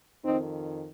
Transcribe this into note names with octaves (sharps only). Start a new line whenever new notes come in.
F2 D#3 C4 D#4